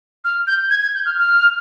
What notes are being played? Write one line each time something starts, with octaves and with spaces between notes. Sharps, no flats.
F6
G6
G#6
G#6
G6
F6
F6